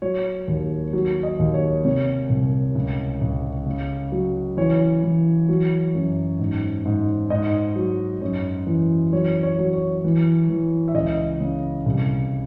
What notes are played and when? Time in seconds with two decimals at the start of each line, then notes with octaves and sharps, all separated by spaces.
0.02 F#3 C#5
0.48 D#2
0.93 F#3
1.23 D#5
1.39 D#2
1.54 C#5
1.84 C3 C#5
2.30 C2
2.75 C#2
3.21 C#2
3.66 C#3
4.12 F#3
4.57 E3 C#5
5.03 E3
5.49 F#3
5.95 F#2
6.39 G#2
6.86 G#2
7.30 G#2 D#5
7.76 F#3
8.21 F#2 C#5
8.66 E3
9.12 F#3 C#5
9.43 C#5
9.59 F#3
9.73 C#5
10.04 E3
10.49 E3
10.88 E5
10.95 C#2 D#5
11.41 C#3
11.86 C2